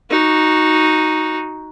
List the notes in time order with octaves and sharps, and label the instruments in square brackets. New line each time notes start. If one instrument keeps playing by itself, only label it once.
[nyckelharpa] D#4 F#4